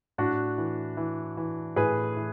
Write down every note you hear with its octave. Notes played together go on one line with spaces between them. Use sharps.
A2 D4 F#4
E3
E3
E3
A2 G#4 B4
E3